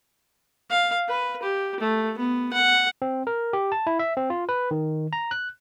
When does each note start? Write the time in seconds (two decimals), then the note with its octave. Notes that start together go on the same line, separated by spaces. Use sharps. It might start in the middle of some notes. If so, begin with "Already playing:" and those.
0.70 F5
1.08 B4
1.42 G4
1.80 A3
2.18 B3
2.53 F#5
3.02 C4
3.27 A#4
3.53 G4
3.72 A5
3.87 E4
3.99 E5
4.17 C4
4.30 F4
4.49 B4
4.71 D#3
5.13 A#5
5.31 F#6